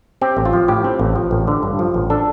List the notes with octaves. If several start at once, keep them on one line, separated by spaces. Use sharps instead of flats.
C4 G4
A1
F4
F3
A2 G4
C4
A1
F3
A1
D3
G2
F3
A1
D4 A4